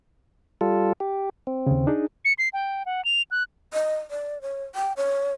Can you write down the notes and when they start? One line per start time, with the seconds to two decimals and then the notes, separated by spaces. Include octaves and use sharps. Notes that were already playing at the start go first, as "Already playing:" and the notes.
0.61 G3 F4 A4
1.00 G4
1.47 C4
1.67 D#2 C#3
1.87 D4 D#4 G#4
2.25 C#7
2.38 C7
2.53 G5
2.86 F#5
3.05 F7
3.31 F#6
3.73 D#5
4.11 D5
4.42 C#5
4.75 G5
4.97 C#5